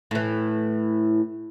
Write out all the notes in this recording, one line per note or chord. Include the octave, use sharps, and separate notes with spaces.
A2 E3